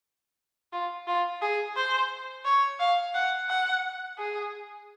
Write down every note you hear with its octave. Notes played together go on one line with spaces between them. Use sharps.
F4
F4
G#4
C5
C#5
F5
F#5
F#5
G#4